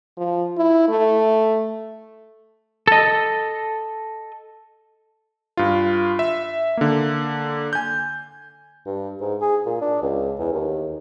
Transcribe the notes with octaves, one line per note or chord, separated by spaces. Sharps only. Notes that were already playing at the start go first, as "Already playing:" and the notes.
F3
E4
A3
A4 D#5
G2 F4
E5
D3 A#3
G#5 G6
G2
G#2
G#4
A#2
D4
C#2
E2
D#2